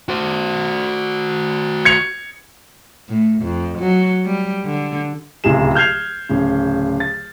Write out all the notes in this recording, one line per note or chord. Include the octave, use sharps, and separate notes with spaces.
F#4 C5
G#6 C#7 F7
A2
F2
F#3
G3
D3
D1 C#2 C3 G#4 E7
F6 G6 G#6 C7 F7
D1 C#3
A6